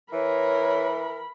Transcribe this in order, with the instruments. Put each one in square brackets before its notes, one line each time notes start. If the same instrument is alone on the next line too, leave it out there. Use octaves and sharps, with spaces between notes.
[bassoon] E3 [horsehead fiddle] A#4 [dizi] C#5 [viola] B5